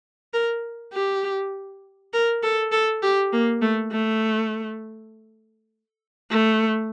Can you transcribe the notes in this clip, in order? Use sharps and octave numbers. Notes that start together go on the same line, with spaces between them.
A#4
G4
A#4
A4
A4
G4
A#3
A3
A3
A3